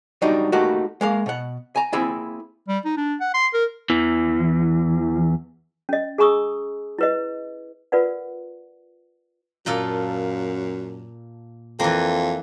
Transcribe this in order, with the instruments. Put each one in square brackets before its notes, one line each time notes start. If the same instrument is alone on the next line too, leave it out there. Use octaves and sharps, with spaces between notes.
[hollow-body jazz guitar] F#3 G3 D4 D#4 F#4
A3 A#3 D#4 F#4 G4
G#3 A#3 F5
B2 F#5
G#5 A#5
A#3 C4 E4 G#4
[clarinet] G3
D#4
D4
F#5
C6
A#4
[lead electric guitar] E2 E3
[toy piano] C#4 D#5
G#4 G#5 A#5 C#6 D#6 E6
E4 B4 D#5
F4 A#4 B4 D5 F#5
[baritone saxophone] F#2 [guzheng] A#2 F4 A4
[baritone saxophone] F2 [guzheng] E3 A#3